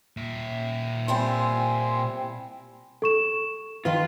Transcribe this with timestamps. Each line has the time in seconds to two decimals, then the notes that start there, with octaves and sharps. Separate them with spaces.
0.17 A#2 E5
1.08 G3 C4 E4 G#5 C6
3.02 A4 C#6 E7
3.85 D#3 F4 B4